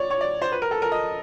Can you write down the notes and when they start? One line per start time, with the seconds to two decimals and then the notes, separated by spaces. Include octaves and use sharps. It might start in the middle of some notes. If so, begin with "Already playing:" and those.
Already playing: C#5 D5
0.10 C#5
0.21 D5
0.41 C5
0.52 B4
0.62 A#4
0.71 A4
0.82 A#4
0.92 D#5